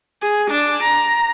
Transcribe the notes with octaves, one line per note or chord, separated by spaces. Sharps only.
G#4
D4
A#5